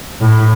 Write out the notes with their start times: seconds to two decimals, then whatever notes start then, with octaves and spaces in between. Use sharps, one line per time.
0.21 A2